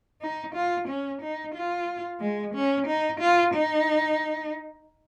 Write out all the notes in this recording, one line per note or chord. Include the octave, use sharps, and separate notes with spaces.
D#4
F4
C#4
D#4
F4
G#3
C#4
D#4
F4
D#4